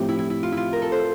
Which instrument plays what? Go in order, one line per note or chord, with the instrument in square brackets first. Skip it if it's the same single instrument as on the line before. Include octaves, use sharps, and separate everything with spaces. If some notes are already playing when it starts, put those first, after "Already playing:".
Already playing: [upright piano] A2 F3 C4 G4
[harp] E4
E4
E4
F4
E4
F4
A#4
A4
C5